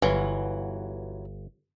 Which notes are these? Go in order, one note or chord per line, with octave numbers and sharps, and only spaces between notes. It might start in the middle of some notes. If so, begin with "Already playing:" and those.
G1 E3 F#3